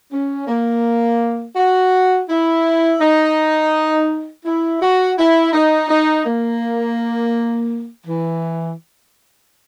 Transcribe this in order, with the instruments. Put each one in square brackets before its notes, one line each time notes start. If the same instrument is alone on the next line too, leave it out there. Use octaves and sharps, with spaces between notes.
[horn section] C#4
A#3
F#4
E4
D#4
E4
F#4
E4
D#4
D#4
A#3
E3